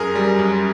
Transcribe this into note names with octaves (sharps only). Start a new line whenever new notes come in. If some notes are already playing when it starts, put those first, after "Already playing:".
Already playing: F#2 G#4 A#4
G3
F#2